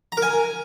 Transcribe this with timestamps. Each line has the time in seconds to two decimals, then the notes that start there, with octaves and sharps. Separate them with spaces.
0.12 A#5
0.17 A#4
0.22 G#5